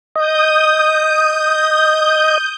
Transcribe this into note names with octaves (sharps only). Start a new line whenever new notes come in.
D#5 D#6 G6